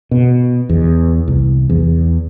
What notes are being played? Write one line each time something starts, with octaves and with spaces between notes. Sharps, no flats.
B2
E2
C2
E2